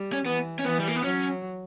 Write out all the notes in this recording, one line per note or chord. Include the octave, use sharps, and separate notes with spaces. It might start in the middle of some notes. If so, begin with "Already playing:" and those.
Already playing: G3
C#4
E3 B3
C#4
E3 B3
G3
A#3
B3
F#3 C#4